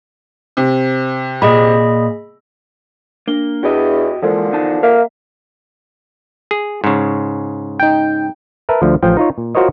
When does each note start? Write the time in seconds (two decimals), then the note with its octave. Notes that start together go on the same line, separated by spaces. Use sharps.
0.57 C3
1.42 A#2 G#4 D#5 B5
3.28 A#3 D4 G7
3.63 E2 F#4 G4 D#5
4.22 D3 E3 F3 G#3 A#3 A4 A#4
4.52 E2 D#4 A5
4.83 A#3 E5 F5
6.51 G#4
6.84 G#2 C#3
7.79 D#4 G5
8.69 A#4 B4 E5 A5
8.82 D2 D3 F3
9.03 A1 F3 G5
9.17 D#4 F4 C#5
9.38 A#2
9.55 F4 F#4 A#4 C5 C#5 D#5